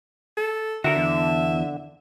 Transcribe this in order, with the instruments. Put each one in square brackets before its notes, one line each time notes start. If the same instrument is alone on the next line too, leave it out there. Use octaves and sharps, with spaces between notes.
[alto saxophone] A4
[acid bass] D3 [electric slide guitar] F#4 A#4 [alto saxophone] E5
[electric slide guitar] E2